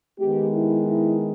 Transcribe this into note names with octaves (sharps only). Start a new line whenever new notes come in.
D#3 G#3 B3 G4
E4
E4